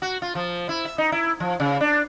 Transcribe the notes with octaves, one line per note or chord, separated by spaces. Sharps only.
F#4
F4
F3
E4
E5
D#4
E4
F3
C#3
D4